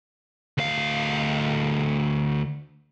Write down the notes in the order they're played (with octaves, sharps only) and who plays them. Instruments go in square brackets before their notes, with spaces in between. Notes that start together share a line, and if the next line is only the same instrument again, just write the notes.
[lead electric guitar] D2 F5